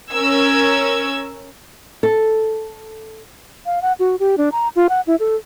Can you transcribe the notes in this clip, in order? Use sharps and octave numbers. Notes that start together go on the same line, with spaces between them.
C#4 A#4 E6 G#6
A4
F5
F#5
F#4
G4
D4
A#5
F4
F#5
E4
A4